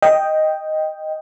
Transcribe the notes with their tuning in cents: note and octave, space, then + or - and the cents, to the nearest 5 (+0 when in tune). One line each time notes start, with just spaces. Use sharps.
D#5 +0 G5 +0